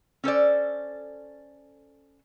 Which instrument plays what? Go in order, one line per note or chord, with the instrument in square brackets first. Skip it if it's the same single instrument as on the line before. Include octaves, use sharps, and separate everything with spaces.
[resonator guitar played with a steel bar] C#4 A4 C5 D5